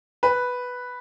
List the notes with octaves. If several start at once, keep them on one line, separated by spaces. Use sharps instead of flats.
B4